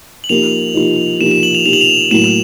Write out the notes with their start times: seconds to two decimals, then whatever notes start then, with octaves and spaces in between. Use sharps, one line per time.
0.24 F#7
0.29 F3 A#3 D#4 G4 F7
0.74 F3 A#3 D#4 G4
1.20 F3 A#3 D#4 G4 E7
1.31 E7
1.43 F#7
1.55 F7
1.66 F3 A#3 D#4 G4 F7
1.73 F#7
1.81 F7
2.11 A2 F#3 A#3 E7
2.24 F7